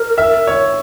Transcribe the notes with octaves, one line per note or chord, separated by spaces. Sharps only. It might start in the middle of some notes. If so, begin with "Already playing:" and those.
Already playing: A#4
E5
C#5